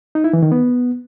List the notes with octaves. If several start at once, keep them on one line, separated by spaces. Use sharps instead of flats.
D#4
E4
E3
D#3
B3